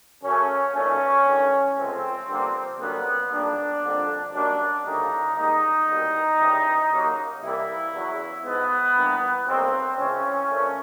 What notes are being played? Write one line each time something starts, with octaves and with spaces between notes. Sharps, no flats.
F#2 C#3 F#3 A3 C#4
B1 A#2 F#3 A3 C#4
A1 G2 D#3
C#2 C3 F3 A3 C4
G2 D3 F3 A#3
F#2 D3 G3 A#3 B3
B1 A#2 G3 A#3 D4
F2 D3 G3 A#3
F#2 D#3 G3 A#3 D4
D2 C#3 E3 G3 A#3 D#4
G#2 D#3 G3 A#3 D#4
C2 B2 G3 A#3
C#2 C3 E3 G3
D#2 C#3 F#3 A#3
C2 C3 E3 G3 A#3 E4
E2 C#3 F#3
G#2 F3 G#3 B3
G2 E3 G3 A#3
B1 B2 G3 A#3 C4
C#2 C#3 E3 C#4
A#1 A#2 F3 A3